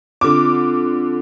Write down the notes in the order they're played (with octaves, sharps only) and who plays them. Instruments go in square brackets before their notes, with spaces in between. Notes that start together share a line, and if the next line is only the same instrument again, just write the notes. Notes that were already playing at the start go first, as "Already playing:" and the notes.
[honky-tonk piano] D3 D6 [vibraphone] C4 F4